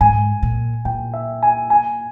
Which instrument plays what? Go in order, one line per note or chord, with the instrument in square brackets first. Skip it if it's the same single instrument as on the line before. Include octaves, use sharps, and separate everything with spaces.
[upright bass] G#2 [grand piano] G#5
[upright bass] A#2
[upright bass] A#2 [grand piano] G5
[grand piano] E5
G#5
G#5